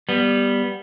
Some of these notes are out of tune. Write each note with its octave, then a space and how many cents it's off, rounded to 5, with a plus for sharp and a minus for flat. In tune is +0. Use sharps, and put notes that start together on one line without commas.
G3 +5 B3 -10